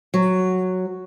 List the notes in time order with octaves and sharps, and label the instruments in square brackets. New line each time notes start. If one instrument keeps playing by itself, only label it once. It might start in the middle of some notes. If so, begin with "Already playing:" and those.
[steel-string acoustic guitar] F#3